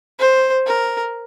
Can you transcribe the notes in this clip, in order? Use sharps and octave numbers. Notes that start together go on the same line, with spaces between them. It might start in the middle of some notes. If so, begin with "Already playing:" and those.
C5
A#4